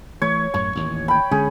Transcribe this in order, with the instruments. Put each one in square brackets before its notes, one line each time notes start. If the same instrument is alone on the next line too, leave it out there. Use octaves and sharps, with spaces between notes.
[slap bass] E3 A3 [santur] C#5
[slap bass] F#2 A2 [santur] C#6
[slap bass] A1 D#2
[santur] G5 B5
[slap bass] D3 G#3 C#4 [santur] G#4